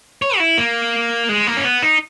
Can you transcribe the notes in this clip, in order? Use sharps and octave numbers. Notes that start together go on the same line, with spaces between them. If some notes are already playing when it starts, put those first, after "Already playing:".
C#5
F#4
E4
A#3
G#3
A#3
C#4
B3
D#4